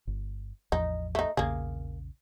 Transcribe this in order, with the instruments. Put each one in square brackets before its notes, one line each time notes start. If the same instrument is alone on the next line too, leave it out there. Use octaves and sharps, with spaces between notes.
[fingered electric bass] G1
[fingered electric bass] A1 E2 F3 [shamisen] D#4
[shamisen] A3 D#4
[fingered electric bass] A#1 E2 C#3 [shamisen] A#3 G#4